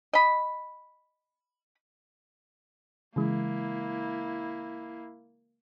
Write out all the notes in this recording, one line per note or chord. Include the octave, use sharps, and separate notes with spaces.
D#5 B5
C#3 E3 G#3 A#3 E4